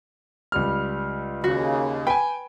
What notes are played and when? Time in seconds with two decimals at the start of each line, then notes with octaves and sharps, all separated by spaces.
0.52 C#2 G3 F6
1.44 D#2 C#3 F#4
2.07 B4 G5 G#5